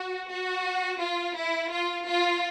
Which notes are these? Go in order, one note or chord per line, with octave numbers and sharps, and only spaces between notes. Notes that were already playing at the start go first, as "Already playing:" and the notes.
Already playing: F#4
F#4
F4
E4
F4
F4